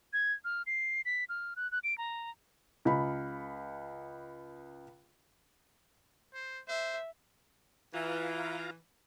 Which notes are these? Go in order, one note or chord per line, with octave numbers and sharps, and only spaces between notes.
G#6
F6
C7
B6
F6
F#6
F#6
D7
A#5
C#2 B5
C5
C5 E5
E3 F4 F5 A#5